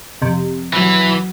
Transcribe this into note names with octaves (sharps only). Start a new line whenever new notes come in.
F2 C3
E3 F#3